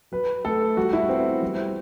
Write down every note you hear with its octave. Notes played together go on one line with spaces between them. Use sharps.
F#3 B4
A3 A4
G3 F#4
E4
B3 C4
G3